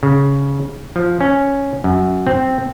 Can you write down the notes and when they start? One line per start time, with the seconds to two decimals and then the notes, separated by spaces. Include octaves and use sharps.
0.03 C#3
0.96 F3
1.21 C#4
1.84 F#2
2.27 C4